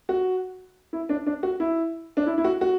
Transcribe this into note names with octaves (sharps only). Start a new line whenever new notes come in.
F#4
E4
D4
D4
F#4
E4
D4
E4
E4
F#4
F#4